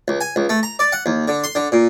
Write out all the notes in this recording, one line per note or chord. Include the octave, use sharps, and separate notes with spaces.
C#2
G#5
C#2
A3
A#5
D5
F#5
D#2
D3
C6
D3
A#2